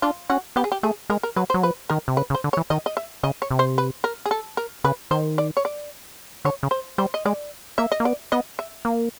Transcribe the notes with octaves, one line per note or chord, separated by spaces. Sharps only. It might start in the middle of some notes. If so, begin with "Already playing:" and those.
D4 F4
C#4 F#4
B3 G4
G#4
G4
A3 G#4
G#3 A#4
A#4
F#3 B4
C5
F#3
F3 B4
D#3 A#4
C3
C#3 B4
C#3
C5
D3
C#5
E3
D#3 D#5
D#5
E5
C#3 D#5
C#5
C3
C5
B4
A#4
G#4
A4
A#4
C#3 B4
D#3 C5
D5
C#5
D5
D3 C#5
C#3
C5
G3 C5
D#5
G#3 D5
A#3 E5
D#5
A#3
B3 D5
B3 D#5
E5
A#3